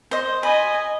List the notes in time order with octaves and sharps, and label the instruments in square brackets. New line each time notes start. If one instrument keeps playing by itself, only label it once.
[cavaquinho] C5 D#5
[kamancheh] D#5 G#5 [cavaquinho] B5